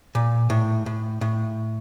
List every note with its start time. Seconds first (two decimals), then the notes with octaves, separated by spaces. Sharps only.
0.15 A#2
0.50 A2
0.86 A2
1.21 A2